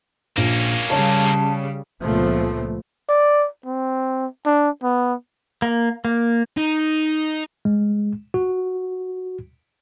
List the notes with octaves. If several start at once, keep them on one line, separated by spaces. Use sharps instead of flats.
A#1 A#3 C#4
C#3 G3 C#5 A5
C#2 A#2 F3 A3 B3
D5
C4
D4
B3
A#3
A#3
D#4
G#3
F#4